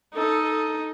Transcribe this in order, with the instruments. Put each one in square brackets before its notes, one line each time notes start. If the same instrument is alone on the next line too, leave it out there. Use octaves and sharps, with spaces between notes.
[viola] D#4 [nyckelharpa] A4
[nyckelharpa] A4